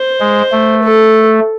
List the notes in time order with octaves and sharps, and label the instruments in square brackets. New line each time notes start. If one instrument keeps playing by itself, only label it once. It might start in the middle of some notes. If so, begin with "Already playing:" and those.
Already playing: [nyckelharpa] C5
[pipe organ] G#3
A3
[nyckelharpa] A4